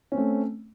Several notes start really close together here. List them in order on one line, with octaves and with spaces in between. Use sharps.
C#4 C4 A3